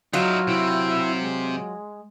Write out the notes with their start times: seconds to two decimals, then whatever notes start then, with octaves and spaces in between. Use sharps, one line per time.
0.13 F#3 D#4 F4 E5
0.47 C3 C4 E4
1.21 G#3